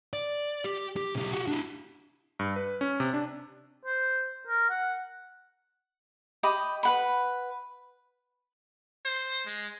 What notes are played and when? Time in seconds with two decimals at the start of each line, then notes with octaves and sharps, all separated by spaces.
0.13 D5
0.64 G4
0.96 G4
1.15 B1 G4
1.32 F#4 G4
1.48 D4 E4
2.39 G2
2.56 B4
2.81 C#4
3.00 C3
3.14 D4
3.85 C5
4.47 A#4
4.70 F#5
6.43 G4 D#5 B5
6.83 B4 F#5 B5
9.05 C5
9.47 G#3